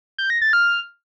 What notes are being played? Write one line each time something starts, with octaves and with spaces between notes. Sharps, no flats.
G6
A#6
A6
F6